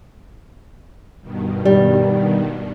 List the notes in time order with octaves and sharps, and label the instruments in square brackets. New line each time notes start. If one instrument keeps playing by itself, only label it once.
[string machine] G2 B2 D#3
[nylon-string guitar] G3